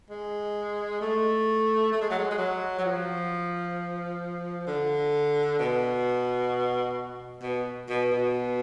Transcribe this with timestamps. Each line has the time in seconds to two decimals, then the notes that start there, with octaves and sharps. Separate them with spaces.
0.10 G#3
1.01 A3
1.93 A3
2.01 G#3
2.10 F#3
2.19 G#3
2.31 G#3
2.38 F#3
2.79 F#3
2.85 F3
4.67 D3
5.59 B2
7.43 B2
7.89 B2
8.12 B2